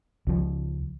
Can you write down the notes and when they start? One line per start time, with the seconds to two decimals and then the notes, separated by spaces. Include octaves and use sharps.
0.27 C#2 F3